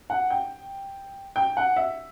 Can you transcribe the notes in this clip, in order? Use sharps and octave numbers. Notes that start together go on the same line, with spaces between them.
F#5
G5
G5
F#5
E5